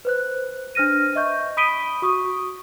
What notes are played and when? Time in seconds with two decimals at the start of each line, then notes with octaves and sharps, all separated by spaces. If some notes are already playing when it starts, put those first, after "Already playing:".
0.05 B4 C5 F#6
0.75 D4 C5 F6 A#6 D#7
1.15 D#5 E5 C#6 G6
1.57 B5 D#6 B6 D7 D#7 G7
2.02 F#4 C#6 D#6